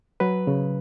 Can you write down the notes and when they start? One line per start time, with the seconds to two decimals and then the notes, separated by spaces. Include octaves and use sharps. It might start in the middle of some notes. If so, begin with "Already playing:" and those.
0.20 F#3 B4
0.47 C#3